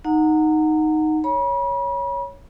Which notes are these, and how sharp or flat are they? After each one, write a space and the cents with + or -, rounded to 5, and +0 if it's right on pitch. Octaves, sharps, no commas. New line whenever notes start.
D#4 +0 F#5 -10 A#5 -25
C#5 +0 B5 -40